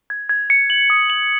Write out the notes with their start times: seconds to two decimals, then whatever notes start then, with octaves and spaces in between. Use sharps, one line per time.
0.10 G#6
0.29 G#6
0.50 C#7
0.70 F#7
0.90 D#6
1.10 F#7